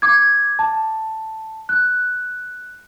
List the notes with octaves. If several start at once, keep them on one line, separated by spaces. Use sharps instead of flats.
D6 G#6
A5
F#6